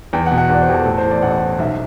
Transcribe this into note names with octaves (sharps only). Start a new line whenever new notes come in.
E2 G5
F#5
B2
F#5
E2 D5
C5
E2 G4
A4
A2 A4
C5
E3
D5
A1 F#5
A1
B1 E5